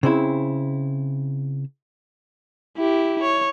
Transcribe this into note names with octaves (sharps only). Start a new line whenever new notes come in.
C#3 C4 E4
E4 G4
C#5